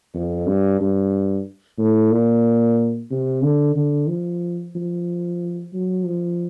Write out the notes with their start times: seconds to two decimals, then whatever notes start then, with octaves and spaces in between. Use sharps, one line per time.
0.14 F2
0.47 G2
0.81 G2
1.79 A2
2.12 A#2
3.11 C3
3.43 D3
3.76 D3
4.09 F3
4.75 F3
5.74 F#3
6.06 F3